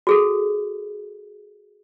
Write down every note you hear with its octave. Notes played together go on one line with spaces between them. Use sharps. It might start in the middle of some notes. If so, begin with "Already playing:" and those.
F#4 G#4 A4